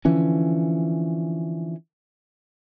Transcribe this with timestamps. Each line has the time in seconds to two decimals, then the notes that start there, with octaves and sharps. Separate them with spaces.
0.05 D3 E3 F3 C#4